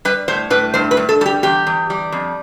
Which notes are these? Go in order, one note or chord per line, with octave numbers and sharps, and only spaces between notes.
G3 B4
A2 C5
A2 B4
G2 C5
B4
G2
A4
G3 G4 A4
E2 G4
E2
G3
F2